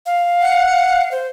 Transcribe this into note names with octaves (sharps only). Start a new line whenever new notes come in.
F5
F#5
C5